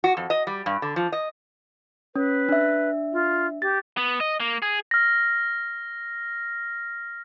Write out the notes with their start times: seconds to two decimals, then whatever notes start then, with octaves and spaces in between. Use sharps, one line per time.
0.04 F#4
0.17 F2
0.30 D#5
0.47 G3
0.66 G2
0.82 D3
0.96 F3
1.12 D#5
2.16 C#4 B4
2.49 D4 E5
3.13 F4
3.62 G4 A6
3.97 B3
4.20 D#5
4.40 A#3
4.62 G#4
4.91 F6 A#6